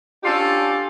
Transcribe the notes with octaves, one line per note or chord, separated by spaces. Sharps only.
C#4 D4 F4 G4 A4